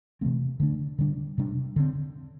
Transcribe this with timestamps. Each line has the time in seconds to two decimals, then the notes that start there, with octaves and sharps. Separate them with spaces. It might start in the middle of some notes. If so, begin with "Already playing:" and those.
0.21 C3 E3 A3 C4
0.60 D3 A3 D4
0.99 D3 G3 D4
1.38 C3 G3 D4
1.76 D3 C4